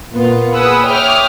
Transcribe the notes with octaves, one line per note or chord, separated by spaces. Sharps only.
A#2 B3 F4
G#4 B4 F#5 D#6 E6
C#5 E5 G5 D6 D#6 F6